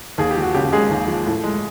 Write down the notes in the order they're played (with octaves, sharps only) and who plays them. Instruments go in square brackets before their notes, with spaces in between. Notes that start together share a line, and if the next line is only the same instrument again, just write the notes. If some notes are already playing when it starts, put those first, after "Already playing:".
[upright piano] D#2 G#4
G4
F3
F#4
C#3 G4
G#3 G#4
D#2
F3
A2
G#3